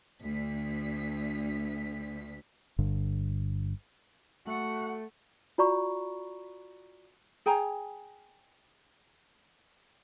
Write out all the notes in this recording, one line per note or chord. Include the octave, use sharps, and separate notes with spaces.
D2 B6
G1 G2 D3
A3 F#4 F#5
F4 F#4 D5 A#5 B5 C#6
G#4 G5 G#5 A#5